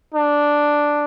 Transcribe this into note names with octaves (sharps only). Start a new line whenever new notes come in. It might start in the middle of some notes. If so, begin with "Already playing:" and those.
D4